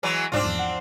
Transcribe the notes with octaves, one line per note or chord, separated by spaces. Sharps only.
E3 F#3 G#3
C2 G#2 C4 D4 F4 D6
E2 F3
F#5